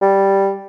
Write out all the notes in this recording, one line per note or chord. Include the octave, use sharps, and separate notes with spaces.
G3